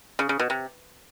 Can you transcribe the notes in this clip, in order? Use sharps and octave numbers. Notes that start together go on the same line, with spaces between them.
C#3
C#3
B2
C3